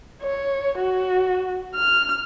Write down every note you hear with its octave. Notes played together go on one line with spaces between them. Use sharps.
C#5
F#4
F6